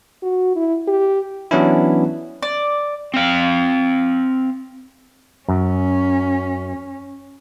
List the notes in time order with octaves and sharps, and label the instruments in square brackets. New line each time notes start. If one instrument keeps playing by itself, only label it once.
[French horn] F#4
E4
G4
[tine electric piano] E3 F#3 B3 C#4 D4 E4
[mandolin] D5
[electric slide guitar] C4 F5
[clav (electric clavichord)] F#2 [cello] C#4